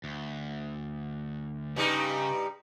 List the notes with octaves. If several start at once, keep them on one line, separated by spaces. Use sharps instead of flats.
D2
G2 C#3 G3 D#4